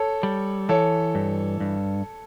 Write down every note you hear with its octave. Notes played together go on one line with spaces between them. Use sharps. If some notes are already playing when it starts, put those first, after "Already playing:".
Already playing: A4 C#5
G3
E3 A4 C#5
G2
G2